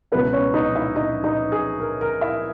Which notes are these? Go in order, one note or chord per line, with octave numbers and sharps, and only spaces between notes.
C#2 B2 F#3 B3 E4 B4
C#4 C#5
D#4 D#5
E4 E5
D#4 D#5
D#4 D#5
G#4
A#4
A#4
E4 E5